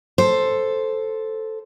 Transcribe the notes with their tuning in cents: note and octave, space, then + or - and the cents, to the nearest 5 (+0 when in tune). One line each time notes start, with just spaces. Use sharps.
A4 +0 C5 +0